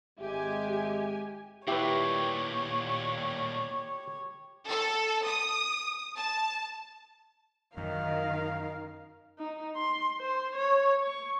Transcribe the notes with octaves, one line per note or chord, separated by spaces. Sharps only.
G#1 G#3 G4 E5 G#5
D#2 A#2 E4 G4 B4 C#5
A4
D#6
A5
F#2 D#3 D#4 A#4 F5
D#4
C6
C5
C#5
C#6